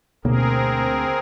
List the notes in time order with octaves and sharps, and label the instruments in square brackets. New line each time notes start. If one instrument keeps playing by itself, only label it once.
[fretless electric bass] D2 A#3 [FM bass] B2 [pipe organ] C4 G#4 A#4